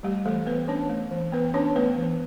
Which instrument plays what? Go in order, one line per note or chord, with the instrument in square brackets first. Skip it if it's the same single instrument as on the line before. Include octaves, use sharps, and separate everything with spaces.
[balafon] G3 A3 G4
E3 A3 A4
E3 B3 B4
C#4 D4 C#5
A3
E3
E3 B3 B4
C#4 D4 C#5
A3 B3 B4
E3